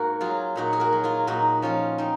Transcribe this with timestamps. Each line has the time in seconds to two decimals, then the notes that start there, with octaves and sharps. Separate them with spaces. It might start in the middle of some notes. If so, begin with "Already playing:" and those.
Already playing: G#2 A#3 F#4 A#4
0.21 F#3 F4 G#4
0.56 A#2 D#4 F#4
0.73 G#4
0.80 F#4 A#4
0.92 F#3
1.03 F4 G#4
1.27 A#2 D#4 F#4
1.62 F3 C#4 F4
1.98 C4 D#4